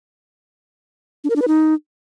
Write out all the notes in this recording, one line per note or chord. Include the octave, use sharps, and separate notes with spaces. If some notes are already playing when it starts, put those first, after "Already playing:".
D4
A#4
D4
B4
D#4